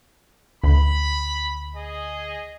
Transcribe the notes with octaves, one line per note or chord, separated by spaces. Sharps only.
D2 B5
G#4 D#5